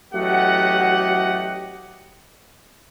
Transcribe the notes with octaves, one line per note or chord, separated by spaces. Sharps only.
A1 F#3 A3 G4 D#5 F#5